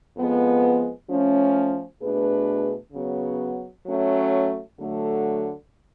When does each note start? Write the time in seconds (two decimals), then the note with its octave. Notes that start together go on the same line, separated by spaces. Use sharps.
0.17 F2 F3 G#3 B3
1.10 F3 A3 C#4
2.02 B2 A3 D4 G#4 B4
2.93 C#3 F#3 B3
3.86 F#3 A3 C#4
4.78 D3 F#3 A3